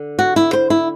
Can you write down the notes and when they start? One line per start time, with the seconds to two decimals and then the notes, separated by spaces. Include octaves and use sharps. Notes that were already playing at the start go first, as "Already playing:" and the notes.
Already playing: D3
0.19 F#4
0.36 E4
0.53 C5
0.70 E4